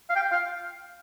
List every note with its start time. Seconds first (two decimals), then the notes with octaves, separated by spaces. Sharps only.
0.10 F5
0.16 G5
0.32 F5